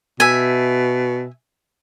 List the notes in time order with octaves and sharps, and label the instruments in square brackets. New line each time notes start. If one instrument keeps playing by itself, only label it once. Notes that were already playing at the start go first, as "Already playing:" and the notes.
[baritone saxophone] B2 [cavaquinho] E5 G#5